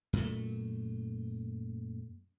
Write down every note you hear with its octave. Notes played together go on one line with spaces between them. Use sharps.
F#2 A#2 A3